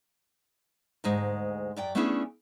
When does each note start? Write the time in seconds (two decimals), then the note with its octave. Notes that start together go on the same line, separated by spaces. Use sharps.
1.04 D2 G#2 G#3
1.76 F#2 D5 G5
1.95 A3 B3 C#4 D4 E4 G#4